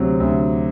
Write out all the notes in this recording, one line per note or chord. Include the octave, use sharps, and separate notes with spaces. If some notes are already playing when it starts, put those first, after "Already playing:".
Already playing: D2 C3 F#3 C4
D2